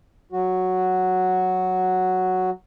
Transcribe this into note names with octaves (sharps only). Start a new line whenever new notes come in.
F#3 F#4